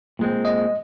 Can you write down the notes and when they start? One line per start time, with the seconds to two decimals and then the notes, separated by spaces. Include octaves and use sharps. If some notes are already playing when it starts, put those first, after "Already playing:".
0.19 A#2 G#3 C4
0.45 D#5